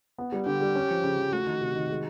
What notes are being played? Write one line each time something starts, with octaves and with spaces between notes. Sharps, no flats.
B3
G3
D3 G4
G3
C#4
F3
C#3
F3
A3 F#4
D#3
C3
D#3
G#3